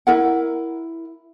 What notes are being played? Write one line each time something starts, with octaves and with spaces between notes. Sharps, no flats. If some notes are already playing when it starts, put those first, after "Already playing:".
E4 A#4 F#5